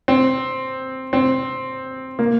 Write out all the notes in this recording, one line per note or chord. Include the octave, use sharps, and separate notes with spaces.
C4
C4
A#3